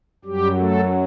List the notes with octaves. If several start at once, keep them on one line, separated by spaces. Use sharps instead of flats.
F#2 F#3 G3 G4
A3 A4